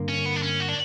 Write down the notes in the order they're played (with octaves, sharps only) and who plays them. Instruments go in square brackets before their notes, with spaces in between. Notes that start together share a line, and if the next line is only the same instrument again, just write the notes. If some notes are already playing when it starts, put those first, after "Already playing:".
Already playing: [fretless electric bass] G2 D3 A#3
[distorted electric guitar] C#4
B3
D4
C#4
F#4
D4